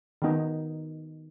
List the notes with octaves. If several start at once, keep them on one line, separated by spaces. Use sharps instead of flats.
D#3 B3 D#4